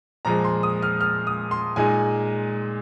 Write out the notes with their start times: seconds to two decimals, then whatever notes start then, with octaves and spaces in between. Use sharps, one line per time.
0.25 A#2 F3 G#3 A#5
0.44 C6
0.63 D#6
0.82 F6
1.01 F6
1.27 D#6
1.51 C6
1.76 A#2 G#3 D#4 G#5